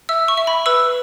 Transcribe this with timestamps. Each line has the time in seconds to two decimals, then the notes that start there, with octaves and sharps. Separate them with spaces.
0.09 E5 E6
0.28 C#6
0.38 E5
0.47 B5
0.66 B4 E6